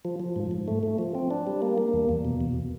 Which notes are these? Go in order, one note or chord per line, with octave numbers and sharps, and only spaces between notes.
F3
F3
G#2
G#2
A3
A3
F3
C4
D4
G3
A#3
A#3
E2
E2
B2
E2